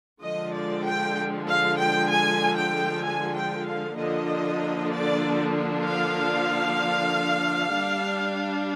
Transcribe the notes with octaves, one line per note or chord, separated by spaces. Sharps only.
D3 F3 G#3 D#5
D5
G5
F5
G5
G#5
G5
G#5
G5
F5
D3 F3 A#3 D4 D#5
D5
F5
G3 D4